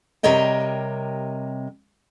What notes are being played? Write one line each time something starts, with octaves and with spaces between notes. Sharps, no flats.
C3 G3 A#4 C#5 D#5 G5